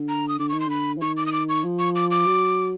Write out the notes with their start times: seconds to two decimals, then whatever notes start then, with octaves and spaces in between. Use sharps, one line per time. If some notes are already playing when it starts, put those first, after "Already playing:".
Already playing: D3
0.09 A#5
0.28 D#6
0.39 D3 D6
0.49 D#3 C#6
0.60 C6
0.67 D3 B5
0.97 E3
1.01 D#3 C#6
1.17 D6
1.26 D#6
1.33 D6
1.49 C#6
1.64 F3
1.79 C#6
1.95 D6
2.11 D6
2.26 F#3